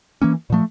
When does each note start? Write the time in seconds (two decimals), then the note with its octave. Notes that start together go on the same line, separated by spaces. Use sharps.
0.22 E3 A#3 C#4
0.50 A#2 F3 A3